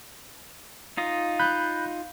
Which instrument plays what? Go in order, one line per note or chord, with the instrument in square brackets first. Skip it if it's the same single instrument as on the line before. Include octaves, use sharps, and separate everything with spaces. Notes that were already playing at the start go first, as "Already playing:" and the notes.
[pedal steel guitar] D#4 F4 D#5
[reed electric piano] B5 F#6 G6